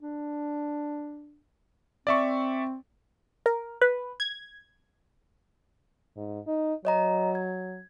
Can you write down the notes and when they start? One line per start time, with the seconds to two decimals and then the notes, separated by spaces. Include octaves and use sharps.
0.01 D4
2.07 C4 D5 E5 C#6
3.46 A#4
3.82 B4
4.20 G#6
6.16 G#2
6.47 D#4
6.85 F#3 C#5 D#5 A#5
7.35 G#6